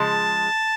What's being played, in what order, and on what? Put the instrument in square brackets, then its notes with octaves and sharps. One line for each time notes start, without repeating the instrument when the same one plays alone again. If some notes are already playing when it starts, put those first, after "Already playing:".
Already playing: [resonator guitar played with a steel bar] C#3 F3 G#3 [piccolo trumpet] A5